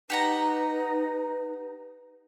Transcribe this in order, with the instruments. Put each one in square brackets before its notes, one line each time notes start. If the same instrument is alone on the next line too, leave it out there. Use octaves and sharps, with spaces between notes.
[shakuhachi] D#4 [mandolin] G4 F#5 A#5 [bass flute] B4